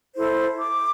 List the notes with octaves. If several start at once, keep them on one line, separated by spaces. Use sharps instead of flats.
E4 A4 C5
D6